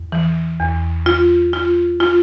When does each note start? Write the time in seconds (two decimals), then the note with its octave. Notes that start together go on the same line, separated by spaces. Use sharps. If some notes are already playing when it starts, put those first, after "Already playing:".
Already playing: E2
0.12 E3
0.60 E2
1.06 F4
1.53 F4
2.00 F4